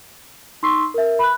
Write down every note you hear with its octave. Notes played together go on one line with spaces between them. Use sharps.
D#4 C6 C#6 E6 B6 C7
A#4 E5
B5 F#6